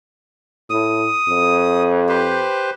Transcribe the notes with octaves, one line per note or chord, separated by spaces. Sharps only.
A2 D#6
F2
G4 B4 C5